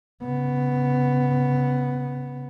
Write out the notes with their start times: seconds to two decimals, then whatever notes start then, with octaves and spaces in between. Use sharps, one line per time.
0.23 C#3 B3